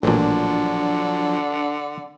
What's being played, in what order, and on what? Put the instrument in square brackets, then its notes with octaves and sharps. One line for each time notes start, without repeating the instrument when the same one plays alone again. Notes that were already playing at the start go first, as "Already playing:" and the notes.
[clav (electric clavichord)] A1 A#2 [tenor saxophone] D3 [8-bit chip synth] F3 F#3 [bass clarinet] D4